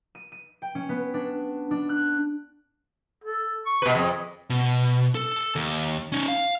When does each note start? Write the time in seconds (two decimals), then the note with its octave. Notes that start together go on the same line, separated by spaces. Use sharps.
0.15 D#7
0.32 D#7
0.62 G5
0.75 C#4
0.89 B3
1.14 D4
1.71 D4
1.89 F#6
3.24 A4
3.66 C#6
3.82 B2 B4
3.95 F2 G#4
4.50 B2
5.15 A4
5.56 D#2
6.12 C#4 D#4
6.28 F5